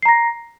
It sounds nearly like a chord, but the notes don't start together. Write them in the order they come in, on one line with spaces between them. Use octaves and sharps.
C7 A#5 A#6